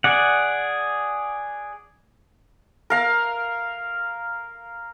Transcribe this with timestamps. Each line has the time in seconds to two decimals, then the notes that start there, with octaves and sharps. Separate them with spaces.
0.04 G#4 D5 F#5
2.90 A#4 F5 A#5